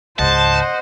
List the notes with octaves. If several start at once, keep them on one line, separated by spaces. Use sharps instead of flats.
C#2 G#2 C5 D#5 F#5 A5